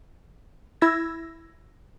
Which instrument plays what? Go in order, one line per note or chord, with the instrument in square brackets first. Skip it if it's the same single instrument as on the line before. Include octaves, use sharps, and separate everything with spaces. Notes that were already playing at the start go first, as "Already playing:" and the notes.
[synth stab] E4 E6 G#6 A#6